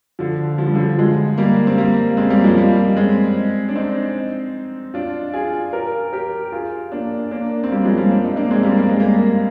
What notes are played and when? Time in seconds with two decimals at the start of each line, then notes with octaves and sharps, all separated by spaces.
0.19 D3 F3
0.58 F3
0.67 G3
0.75 D3 F3
0.98 F3 G#3
1.38 G3 A#3
1.67 C4
1.78 G3 A#3
2.17 G#3 C4
2.30 G3 A#3
2.44 F3 G#3
2.57 G3 A#3
2.97 G#3 C4
3.69 D4
3.76 C4 D#4
4.94 D4 F4
5.33 F4 G#4
5.73 G4 A#4
6.12 G4 A#4
6.52 F4 G#4
6.92 A#3 D4
7.31 A#3 D4
7.64 C4
7.72 G3 A#3
7.84 F3 G#3
7.97 G3 A#3
8.11 D4
8.24 D#4
8.36 A#3 D4
8.51 G#3 C4
8.63 G3 A#3
8.77 A#3
8.89 G#3
9.00 G3 A#3